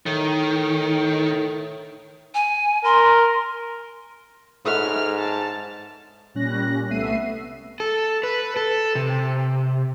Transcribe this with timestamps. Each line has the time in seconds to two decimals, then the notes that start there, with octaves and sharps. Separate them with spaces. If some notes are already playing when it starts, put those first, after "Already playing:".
0.06 A2 D#3
2.34 G#5
2.84 A#4 C6
4.66 G#2 A4 B4 C#5 E5 F#5 F6
5.18 A5
6.35 A#2 G3 C#4 F#6 A#6
6.90 C2 A3 B3 E5 C7 D#7
7.80 A4
8.23 B4
8.56 A4
8.95 C3